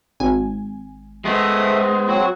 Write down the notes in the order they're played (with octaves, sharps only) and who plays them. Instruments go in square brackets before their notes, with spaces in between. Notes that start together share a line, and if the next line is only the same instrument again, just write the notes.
[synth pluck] G#1 G#5
[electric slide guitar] G#3 [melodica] A3 E5 D#6 [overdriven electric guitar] B3 C5
[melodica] F#3 C4 [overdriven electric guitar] F#4